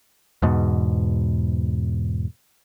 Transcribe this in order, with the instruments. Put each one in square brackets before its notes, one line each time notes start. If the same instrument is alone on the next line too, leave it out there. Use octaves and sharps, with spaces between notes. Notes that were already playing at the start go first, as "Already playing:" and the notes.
[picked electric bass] E2 G#2 B2